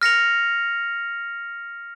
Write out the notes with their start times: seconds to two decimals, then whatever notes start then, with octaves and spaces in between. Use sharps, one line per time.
0.02 F6 A#6 C#7 F7